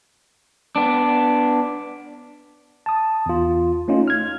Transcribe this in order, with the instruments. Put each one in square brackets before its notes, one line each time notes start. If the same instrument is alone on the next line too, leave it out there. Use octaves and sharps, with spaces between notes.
[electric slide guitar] B3 D4
[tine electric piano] A5 D#6
E2 F4
A3 C#4 D#4 F4
F6 G#6